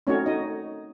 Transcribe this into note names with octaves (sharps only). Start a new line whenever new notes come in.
A3 C4 C#4 D#4 F#4 C#5
D#4 D#5